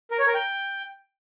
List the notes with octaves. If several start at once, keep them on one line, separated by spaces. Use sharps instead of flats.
A#4
C#5
A#4
G5